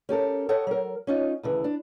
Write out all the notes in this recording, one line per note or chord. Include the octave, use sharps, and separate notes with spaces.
C#4 G4 A4 A#4
A4 C#5 D#5 F#5 G5
F#3 A#4
C#4 D#4 F4
D2 C#3 E3
D4